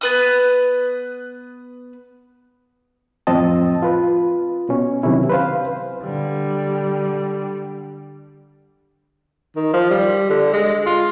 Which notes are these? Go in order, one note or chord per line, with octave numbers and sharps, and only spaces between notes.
B3 B4 D#6
F2 A2 F3 C4 D#5 A5
F4 B4
B2 C#4
C3 D#3 F#3 C#4 E4
B4 C5 F5
D3 G3
D#3
F3
G3
D3
G#3
F4